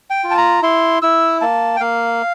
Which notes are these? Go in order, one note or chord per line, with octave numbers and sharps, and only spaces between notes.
G5
F4
A5
A#5
E4 C6
E4 E6
A#3 A5
G5
A#3 F5